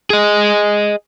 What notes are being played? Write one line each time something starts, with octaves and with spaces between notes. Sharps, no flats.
G#4 D#5